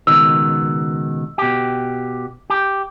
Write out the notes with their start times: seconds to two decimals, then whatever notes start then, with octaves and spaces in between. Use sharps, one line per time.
0.07 C#2 B2 D#3 E6
1.38 B2 G4
2.50 G4